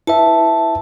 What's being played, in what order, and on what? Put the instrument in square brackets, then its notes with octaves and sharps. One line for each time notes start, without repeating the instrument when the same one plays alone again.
[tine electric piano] E4 B4 E5 [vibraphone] A5